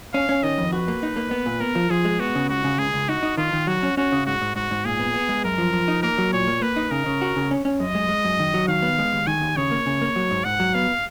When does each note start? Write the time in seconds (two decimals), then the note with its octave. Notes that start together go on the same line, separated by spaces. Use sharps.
0.14 C#4 F5
0.29 C#4
0.43 D#3 D#5
0.58 F2
0.72 F#4 B4
0.88 A#3
1.03 D#4
1.16 A#3
1.31 B3
1.46 A#2
1.60 B3 A#4
1.75 F3
1.90 F3 G#4
2.05 G#3
2.19 B3 F#4
2.35 C#3
2.49 C#2 F#4
2.64 C#3
2.78 C#2 G#4
2.94 C#2
3.09 D#4 F#4
3.23 D#4
3.37 D#3 F4
3.53 D#3
3.67 F#3 F#4
3.83 C#4
3.97 C#4 F#4
4.12 C#3
4.26 G#2 F#4
4.41 G#2
4.56 G#2 F#4
4.71 G#2
4.85 A#2 G#4
4.99 B3
5.14 B3
5.29 G#3
5.45 F#2 A#4
5.58 F3
5.73 F3
5.88 D#4
6.03 A#3 A#4
6.18 F#3
6.33 A#2 C#5
6.48 A#3
6.62 A#3 B4
6.76 D#4
6.91 C#3 A#4
7.06 C#3
7.22 F#4
7.36 C#3
7.51 C#4
7.65 C#4
7.80 F#2 D#5
7.95 G#3
8.09 G#3
8.25 F#2
8.39 D#3
8.54 F#3
8.68 D#3 F5
8.82 B3
8.98 G#3
9.13 D#2
9.27 D#3 G#5
9.41 D#2
9.57 C#3 C#5
9.71 A#3
9.86 C#3
10.01 A#3
10.16 F#3
10.31 G#2
10.45 G#2 F#5
10.60 F#3
10.74 B3 F5